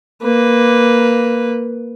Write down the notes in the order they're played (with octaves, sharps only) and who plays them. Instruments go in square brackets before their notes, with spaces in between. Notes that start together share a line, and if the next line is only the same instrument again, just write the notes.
[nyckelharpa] A#3 B4